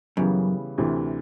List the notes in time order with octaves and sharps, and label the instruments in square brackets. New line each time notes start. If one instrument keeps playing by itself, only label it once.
[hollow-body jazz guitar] F#2 [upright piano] C#3 E3 G3 B3
[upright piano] D2 C3 E3